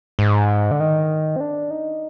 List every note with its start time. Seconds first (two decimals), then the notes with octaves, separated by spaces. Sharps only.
0.19 G#2
0.71 D3
0.80 D#3
1.36 C4
1.40 D4
1.71 D#4